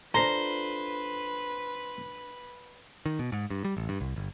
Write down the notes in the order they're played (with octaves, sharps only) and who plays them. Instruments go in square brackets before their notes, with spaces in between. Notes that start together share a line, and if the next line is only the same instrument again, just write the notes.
[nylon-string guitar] D4 F4 A4 [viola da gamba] B4 [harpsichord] C5 [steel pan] A#5
[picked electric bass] D#3
B2
G#2
G2
G3
A1
G2
C2
G1